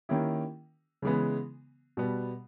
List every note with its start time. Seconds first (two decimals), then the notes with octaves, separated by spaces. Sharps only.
0.09 D#3 A#3 C#4 E4 G4
1.02 C#3 E3 G#3 B3
1.97 B2 G3 B3